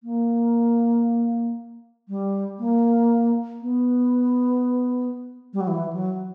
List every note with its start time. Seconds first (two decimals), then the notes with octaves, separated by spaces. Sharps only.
0.03 A#3
2.09 G3
2.59 A#3
3.62 B3
5.53 G3
5.61 F#3
5.68 E3
5.93 F#3